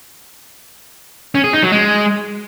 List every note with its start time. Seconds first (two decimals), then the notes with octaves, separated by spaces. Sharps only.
1.35 C#4
1.44 G#4
1.53 D#4
1.62 F#3
1.72 G#3